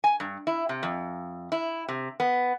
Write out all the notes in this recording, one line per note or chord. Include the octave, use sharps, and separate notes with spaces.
G#5
G2
E4
C3
F2
E4
C3
B3